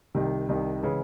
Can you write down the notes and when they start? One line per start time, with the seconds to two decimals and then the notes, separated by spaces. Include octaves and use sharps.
0.15 C2 C3 D#3
0.49 C2 C3 D#3
0.82 C#3 E3 G#3